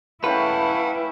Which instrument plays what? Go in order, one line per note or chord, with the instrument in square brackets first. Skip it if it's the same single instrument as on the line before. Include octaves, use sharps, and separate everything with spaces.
[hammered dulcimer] A3 C#4 G4 [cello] E4 [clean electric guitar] B4 [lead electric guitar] F5 F#5